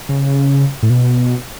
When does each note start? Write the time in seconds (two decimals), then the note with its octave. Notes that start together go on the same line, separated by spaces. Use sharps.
0.09 C#3
0.83 A2
0.90 B2